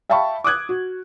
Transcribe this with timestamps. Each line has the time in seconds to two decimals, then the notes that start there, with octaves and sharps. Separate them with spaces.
0.10 E5 F5 G5 A5 B5 C#6
0.44 D6 D#6 F#6 G#6
0.69 F#4